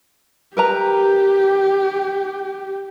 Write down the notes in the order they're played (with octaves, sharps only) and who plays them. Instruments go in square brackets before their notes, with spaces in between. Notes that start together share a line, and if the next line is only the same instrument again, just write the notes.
[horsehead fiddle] G4 [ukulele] A#4 B4 A#5